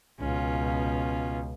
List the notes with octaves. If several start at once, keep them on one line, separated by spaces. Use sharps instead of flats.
C#2 B2 C#4 F4